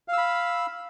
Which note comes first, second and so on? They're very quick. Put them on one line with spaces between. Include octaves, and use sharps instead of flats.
F5 E6 B5